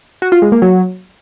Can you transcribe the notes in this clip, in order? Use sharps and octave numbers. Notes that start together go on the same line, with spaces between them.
F#4
F4
G#3
A#3
F#3